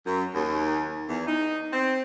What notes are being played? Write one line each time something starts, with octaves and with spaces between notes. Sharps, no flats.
F#2
D#2
E2
D#4
C4